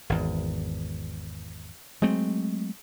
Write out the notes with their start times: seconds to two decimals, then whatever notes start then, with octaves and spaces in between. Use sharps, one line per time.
0.10 G#1 E2
2.02 F#3 G#3 A3 C4